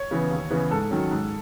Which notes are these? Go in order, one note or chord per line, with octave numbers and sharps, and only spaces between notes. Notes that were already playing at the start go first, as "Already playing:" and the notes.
Already playing: C#5
C#3 E3 B3
D#2
C#3 E3 B3
G#2 A4
D#3 F#3 C#4
G#2